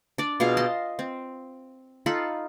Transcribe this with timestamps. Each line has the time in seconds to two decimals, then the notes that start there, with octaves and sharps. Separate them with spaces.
0.18 D4 D5
0.40 B2 F4 G#4 F5
0.57 D#5 A5 C6
0.99 C4
2.06 D#4 F4 A4 B5